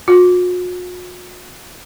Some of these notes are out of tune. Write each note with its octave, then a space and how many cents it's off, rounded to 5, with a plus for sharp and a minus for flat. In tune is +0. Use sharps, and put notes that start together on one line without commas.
F#4 -45